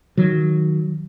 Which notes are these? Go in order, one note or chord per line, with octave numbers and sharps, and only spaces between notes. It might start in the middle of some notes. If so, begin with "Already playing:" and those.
D#3 F#3